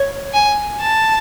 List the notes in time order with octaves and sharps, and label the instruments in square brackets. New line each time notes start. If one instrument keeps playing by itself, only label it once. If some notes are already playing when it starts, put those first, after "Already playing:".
Already playing: [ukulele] C#5
[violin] G#5
A5